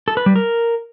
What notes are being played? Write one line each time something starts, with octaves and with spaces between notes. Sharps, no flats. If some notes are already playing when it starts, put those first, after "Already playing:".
A4
B4
G3
A#4